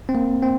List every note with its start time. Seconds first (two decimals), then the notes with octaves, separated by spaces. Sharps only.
0.09 C4
0.15 A#3
0.43 C4